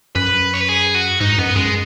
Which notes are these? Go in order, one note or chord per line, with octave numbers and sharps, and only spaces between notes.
F#2 B4
C#5
B4
G#4
F#4
G#2 D#4
F#2 B3
F#2 G#3